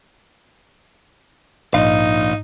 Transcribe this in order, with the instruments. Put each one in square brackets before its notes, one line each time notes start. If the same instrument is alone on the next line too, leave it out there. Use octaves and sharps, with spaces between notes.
[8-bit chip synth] A#1 [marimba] G#2 D#5 [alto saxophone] D#4 [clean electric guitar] F5